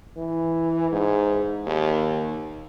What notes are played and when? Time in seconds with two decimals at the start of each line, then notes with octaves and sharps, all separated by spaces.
0.17 E3
0.92 G#2
1.66 D#2